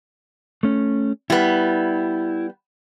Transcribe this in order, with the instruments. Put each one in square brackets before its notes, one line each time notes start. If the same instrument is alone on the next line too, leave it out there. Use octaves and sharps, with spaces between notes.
[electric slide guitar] A3 C#4
[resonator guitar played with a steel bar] G3 B3 [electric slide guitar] E4